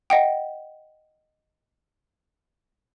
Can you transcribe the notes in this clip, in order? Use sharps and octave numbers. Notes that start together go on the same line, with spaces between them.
D#5 F#5 G5